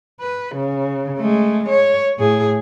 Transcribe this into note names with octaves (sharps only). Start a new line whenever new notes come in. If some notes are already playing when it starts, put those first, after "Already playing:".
B4
C#3
G#3 A3
C#5
A2 G#4